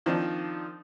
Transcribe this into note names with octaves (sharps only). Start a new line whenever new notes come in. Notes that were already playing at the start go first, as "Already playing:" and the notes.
D#3 F3 C4 D4 D#4